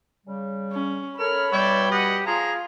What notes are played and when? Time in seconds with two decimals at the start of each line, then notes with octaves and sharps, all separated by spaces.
0.27 C#3 G3
0.72 C#4
1.19 A4 A#4 C#5 B5 F6
1.52 B2 G3 C#5 D5 E5 G5
1.91 G4 D#5 F#5
2.27 F3 F4 G#4 A#5